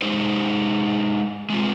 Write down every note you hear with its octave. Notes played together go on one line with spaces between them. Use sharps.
G#3 D#4 G4 C5
G#3 C4 F4